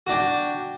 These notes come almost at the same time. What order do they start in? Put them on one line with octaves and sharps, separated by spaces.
F#4 D4 G5